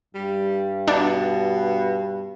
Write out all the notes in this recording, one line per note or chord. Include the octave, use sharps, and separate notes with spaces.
G2 G3
B2 D4